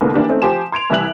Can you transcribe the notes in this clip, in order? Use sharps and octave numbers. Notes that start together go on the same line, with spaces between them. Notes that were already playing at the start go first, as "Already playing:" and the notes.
C2 G#2 D3 A#3 B3
E3 A#3 D4 G4
A3 C4 C#4 D#4 A4
F3 G4 C5 G#5 E7
C6 G#6 D7 F7
C2 E3 G3 E5 F#6 F#7